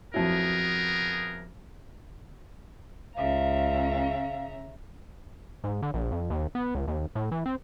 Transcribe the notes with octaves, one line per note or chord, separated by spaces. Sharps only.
F2 F#3 B3 E4 G#4 A#4
C#2 C#3 E5 F5 A#5
G#2
D3
A#1
F2
D#2
B3
C#2
D#2
A2
E3
C4